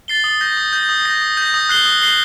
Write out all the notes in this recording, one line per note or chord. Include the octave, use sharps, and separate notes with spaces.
A6 C7 G7
D#6
G6 A#6
D#6
G6 A#6
D#6
G6 A#6
D#6
G6 A#6
D#6
F#6 C7 G7
D#6
F#6 C7 G7